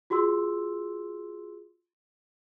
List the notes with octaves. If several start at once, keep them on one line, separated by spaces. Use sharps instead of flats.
F4 F#4 G#4 C6 E6